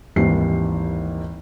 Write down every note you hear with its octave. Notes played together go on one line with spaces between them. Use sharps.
G#1 D#2 E3 G3 C7